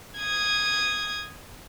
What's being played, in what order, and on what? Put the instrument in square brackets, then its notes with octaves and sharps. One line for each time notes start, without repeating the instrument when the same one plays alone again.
[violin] D#6 G#6